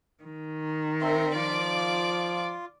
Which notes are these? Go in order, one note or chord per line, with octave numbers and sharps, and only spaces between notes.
D#3
C4 A#4 E5 C6
F3 F4 D5 D6